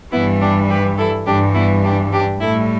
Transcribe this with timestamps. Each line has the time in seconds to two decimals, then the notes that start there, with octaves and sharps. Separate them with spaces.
0.12 G2 E3 G3 B3 E4
0.41 D4 G4
0.70 G4 B4
0.97 E4 A4
1.26 G2 E3 G3 D4 G4
1.55 B3 E4
1.85 D4 G4
2.13 D4 G4
2.41 A2 G3 E4 A4